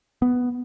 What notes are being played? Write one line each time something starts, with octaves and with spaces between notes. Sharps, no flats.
B3